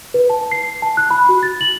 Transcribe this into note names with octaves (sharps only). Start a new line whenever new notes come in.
B4
A5
C7
A5
F#6
B5
F#4
A6
F#7